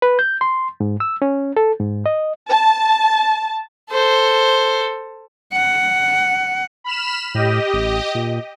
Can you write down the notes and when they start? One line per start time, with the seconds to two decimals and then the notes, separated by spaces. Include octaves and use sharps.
0.02 B4
0.19 G6
0.41 C6
0.80 G#2
1.00 E6
1.22 C#4
1.57 A4
1.79 G#2
2.06 D#5
2.49 A5
3.90 A4 C5
5.53 F#5
6.84 B5 F6 E7
7.35 A2 G4 D#5
7.74 A1
8.15 A#2